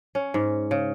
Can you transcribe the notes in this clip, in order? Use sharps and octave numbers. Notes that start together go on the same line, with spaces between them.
C#4
G#2
C#3